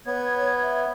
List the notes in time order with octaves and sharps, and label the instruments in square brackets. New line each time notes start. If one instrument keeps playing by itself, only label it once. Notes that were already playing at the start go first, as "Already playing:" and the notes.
[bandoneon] B3 [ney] C#5 [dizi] G#6
[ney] E5